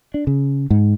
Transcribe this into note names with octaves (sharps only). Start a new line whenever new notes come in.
D4
C#3
G#2